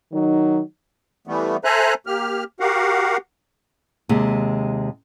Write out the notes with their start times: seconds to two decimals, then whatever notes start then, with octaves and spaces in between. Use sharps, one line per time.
0.12 D#3 F#3 D#4
1.27 E3 G3 A3 B3
1.64 A4 C5 E5 G#5 A#5 F#6
2.07 A#3 G4 F6
2.60 F#4 G4 A#4 F5 F#5
4.09 D#2 C3 G#3